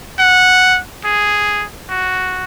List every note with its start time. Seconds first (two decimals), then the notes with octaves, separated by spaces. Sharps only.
0.19 F#5
1.05 G#4
1.90 F#4